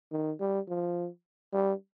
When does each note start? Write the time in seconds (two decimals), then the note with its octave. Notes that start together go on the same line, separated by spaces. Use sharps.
0.12 D#3
0.40 G3
0.68 F3
1.53 G3